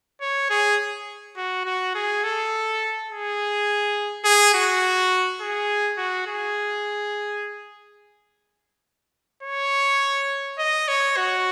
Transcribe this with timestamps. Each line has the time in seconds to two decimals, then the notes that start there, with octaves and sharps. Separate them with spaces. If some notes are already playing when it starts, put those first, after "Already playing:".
0.21 C#5
0.50 G#4
1.37 F#4
1.65 F#4
1.95 G#4
2.24 A4
3.10 G#4
4.24 G#4
4.54 F#4
5.41 G#4
5.98 F#4
6.27 G#4
9.43 C#5
10.59 D#5
10.88 C#5
11.17 F#4